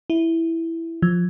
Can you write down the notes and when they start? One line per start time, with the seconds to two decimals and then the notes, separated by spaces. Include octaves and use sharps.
0.10 E4
1.02 F3